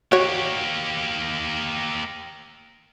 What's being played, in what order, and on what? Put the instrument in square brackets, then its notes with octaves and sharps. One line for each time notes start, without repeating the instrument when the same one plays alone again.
[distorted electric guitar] A#3 G4 [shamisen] F#4 C#5